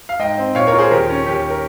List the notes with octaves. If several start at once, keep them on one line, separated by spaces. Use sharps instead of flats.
F5
G#2 D#5 G5
C4
A#2 C#5 F5
A#4 C#5
F4
G#4 C5
D#2 G4 A#4
C#4
D#2 G4
A#4